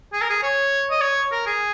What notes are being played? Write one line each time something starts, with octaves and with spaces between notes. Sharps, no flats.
G#4
A#4
G#4
C#5
D#5
C#5
A#4
G#4